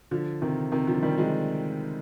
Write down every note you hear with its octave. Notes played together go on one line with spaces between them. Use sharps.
D3 F3
C3 D#3
C3 D#3
D3 F3
D#3 G3
F3 G#3